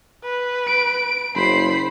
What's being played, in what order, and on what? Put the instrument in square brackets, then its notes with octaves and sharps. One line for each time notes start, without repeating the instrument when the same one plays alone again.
[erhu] B4
[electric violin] D7
[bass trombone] F#1 [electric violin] C5 C7 [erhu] B5